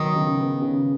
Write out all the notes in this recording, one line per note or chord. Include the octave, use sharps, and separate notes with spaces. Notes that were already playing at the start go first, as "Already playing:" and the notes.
Already playing: D#3 F#3 B3
C#3
B3
C#3